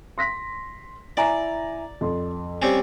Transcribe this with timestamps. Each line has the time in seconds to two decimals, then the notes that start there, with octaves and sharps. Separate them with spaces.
0.18 C6 A#6 B6
1.17 E4 D5 G#5 A#5
2.01 F2 C6
2.62 G3 C4 C#4